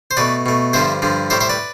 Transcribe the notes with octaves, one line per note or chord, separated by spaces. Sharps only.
C5
B2 A3 B4 D5
B2 A3
G2 D3 F3 C5 E5
G2 D3 F3
A2 G3 C5 E5
C5 E5
B4 D5